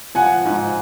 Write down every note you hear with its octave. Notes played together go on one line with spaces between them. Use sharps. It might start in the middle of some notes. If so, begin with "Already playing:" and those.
F3 F#5 G#5
G#2